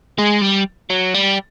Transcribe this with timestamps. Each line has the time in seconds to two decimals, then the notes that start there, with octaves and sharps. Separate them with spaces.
0.18 G#3
0.41 G3
0.90 F#3
1.14 G3